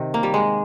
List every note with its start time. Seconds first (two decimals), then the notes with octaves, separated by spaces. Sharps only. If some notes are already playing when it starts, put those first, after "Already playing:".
Already playing: C3 D#3
0.14 A#3
0.23 G3
0.34 G#3